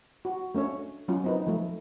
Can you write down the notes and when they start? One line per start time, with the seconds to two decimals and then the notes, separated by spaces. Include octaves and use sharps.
0.25 F#4
0.55 A3 C#4 D4 C#5
1.08 F#3 C#4 F4
1.24 C4 D#4 B4
1.47 F3 A3